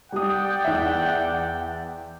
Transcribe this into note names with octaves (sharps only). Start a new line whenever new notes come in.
G3 D5 F#5 G5 D#6
E2 E5